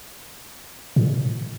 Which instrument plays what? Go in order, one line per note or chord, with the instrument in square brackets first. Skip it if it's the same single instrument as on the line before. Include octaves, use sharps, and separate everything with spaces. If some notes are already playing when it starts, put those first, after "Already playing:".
[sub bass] A2